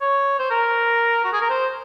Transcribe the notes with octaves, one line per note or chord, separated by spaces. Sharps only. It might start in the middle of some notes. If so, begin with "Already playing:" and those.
C#5
C5
A#4
F#4
G#4
A#4
C5